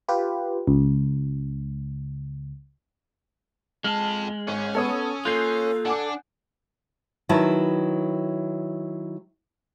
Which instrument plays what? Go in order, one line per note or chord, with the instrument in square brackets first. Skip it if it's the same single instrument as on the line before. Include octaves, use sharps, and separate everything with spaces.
[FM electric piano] F4 G4 B4
C#2
[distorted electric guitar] F2 A5 [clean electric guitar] G#3 [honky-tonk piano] F6
[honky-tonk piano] G#1 [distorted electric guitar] C#4
[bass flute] B3 [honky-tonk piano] A4 C#5 D#6
[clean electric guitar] A#3 F4 [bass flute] A4 [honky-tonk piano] F#6 G6 C7
[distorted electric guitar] D4 [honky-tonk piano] F#5 G#5 D6
[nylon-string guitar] D#3 F#3 E4 B4 A5